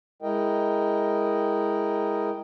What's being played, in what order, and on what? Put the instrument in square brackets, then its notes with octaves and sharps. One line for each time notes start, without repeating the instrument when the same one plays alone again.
[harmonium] G#3 E4 A#4 D#5 G5